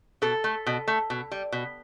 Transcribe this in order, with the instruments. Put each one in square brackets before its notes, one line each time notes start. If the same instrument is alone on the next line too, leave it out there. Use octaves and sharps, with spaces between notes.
[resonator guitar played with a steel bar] B2 A4
A3
B2
A3
B2
G3
B2